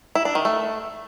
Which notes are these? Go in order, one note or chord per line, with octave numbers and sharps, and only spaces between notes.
E4
D4
D#3
A3